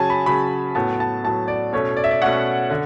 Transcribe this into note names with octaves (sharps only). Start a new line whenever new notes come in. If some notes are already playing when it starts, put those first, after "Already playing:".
Already playing: C#3 F#3 C#4 G#5 A5
B5
C#3 F#3 C#4 B5
A2 F#3 B3 A5
A5
A2 F#3 B3 A5
D5
B2 A3 C#4 C#5
D5
E5
D5
B2 A3 C#4 F#5
D3